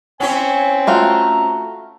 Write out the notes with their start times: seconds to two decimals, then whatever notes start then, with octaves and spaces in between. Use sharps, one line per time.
0.20 C4 C#4 E4 C#5 G#5
0.87 A3 F4 F#4 A#5